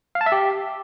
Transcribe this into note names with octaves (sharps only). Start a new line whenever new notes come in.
F5
A5
E5
G4